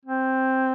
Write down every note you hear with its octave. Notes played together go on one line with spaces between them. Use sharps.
C4